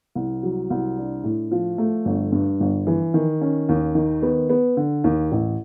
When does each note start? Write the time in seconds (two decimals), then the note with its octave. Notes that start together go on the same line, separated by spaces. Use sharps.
0.15 C2
0.43 F#3
0.70 C2
0.98 D4
1.24 A2
1.51 F3
1.78 A3
2.05 G1
2.32 G2
2.60 G1
2.87 E3
3.14 D#3
3.41 C#4
3.69 D#2
3.95 D#3
4.22 B3
4.49 B3
4.77 D3
5.04 D#2
5.32 A1